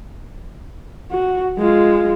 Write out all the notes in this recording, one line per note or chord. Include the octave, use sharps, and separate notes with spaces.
F#4
G#3 F4